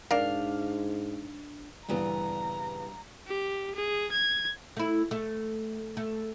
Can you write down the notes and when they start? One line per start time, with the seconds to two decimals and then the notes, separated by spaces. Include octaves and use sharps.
0.11 G#2 D4 A#4 D5 F5
1.89 G2 A#2 C#3 E3 B3 A#5
3.27 G4
3.75 G#4
4.12 G#6
4.77 A3 E4
5.11 A3
5.97 A3